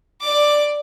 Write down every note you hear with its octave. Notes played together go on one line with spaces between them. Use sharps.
D5 D6